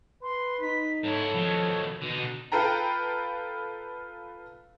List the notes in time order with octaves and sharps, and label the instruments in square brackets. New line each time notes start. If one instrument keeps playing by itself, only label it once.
[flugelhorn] B4 [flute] C6
[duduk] D#4 [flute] B6
[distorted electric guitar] G#2 E4 [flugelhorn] A4 [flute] C#5
[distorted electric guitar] B2 D#3 [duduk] F3
[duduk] B2 [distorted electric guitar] D3 D#4
[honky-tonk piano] F4 A4 B4 G5 A#5